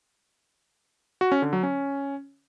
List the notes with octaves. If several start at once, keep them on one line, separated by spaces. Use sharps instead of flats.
F#4
C#4
D3
F#3
C#4